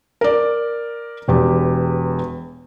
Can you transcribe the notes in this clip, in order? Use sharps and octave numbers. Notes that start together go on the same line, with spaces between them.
A#4 D5
E1 E2 G4